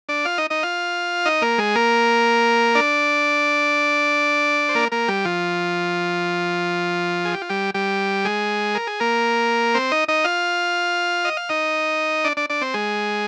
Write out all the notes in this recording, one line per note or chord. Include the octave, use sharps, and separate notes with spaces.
D4 D5
F4 F5
D#4 D#5
D#4 D#5
F4 F5
D#4 D#5
A#3 A#4
G#3 G#4
A#3 A#4
D4 D5
C5
A#3 A#4
A#3 A#4
G3 G4
F3 F4
G#4
G4
F4
G3 G4
G3 G4
G#3 G#4
A#4
G#4
A#3 A#4
C4 C5
D#4 D#5
D#4 D#5
F4 F5
D#5
F5
D#4 D#5
D4 D5
D4 D5
D4 D5
C4 C5
G#3 G#4